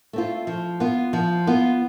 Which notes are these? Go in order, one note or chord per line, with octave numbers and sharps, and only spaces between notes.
A3 C4 F4
F3
B3 F4
F3
B3 F4